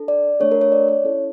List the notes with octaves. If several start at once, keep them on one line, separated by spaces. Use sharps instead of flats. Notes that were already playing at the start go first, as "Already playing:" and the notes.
Already playing: D4 A4
D5
A3 D4 A4 C#5
A#4
C#5
D5
C#5
C#4 E4 A4